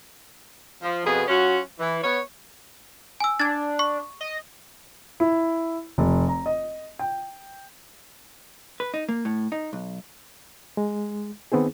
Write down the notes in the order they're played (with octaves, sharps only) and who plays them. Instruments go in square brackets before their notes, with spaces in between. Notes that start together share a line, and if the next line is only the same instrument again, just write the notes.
[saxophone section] F3
F2 B2 B3 F4 G#4
F#3 C#4 F4 F#4
E3
B3 C#5
[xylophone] G#5 E6
[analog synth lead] D4 [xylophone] G#6 A6
[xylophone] C#6
[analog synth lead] D#5
[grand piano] E4
F1
A#5
D#5
G5
[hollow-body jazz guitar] B4
D#4
A#3
A2
D#4
B1
[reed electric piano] G#3
D#3 B3 C4 D#4 G#4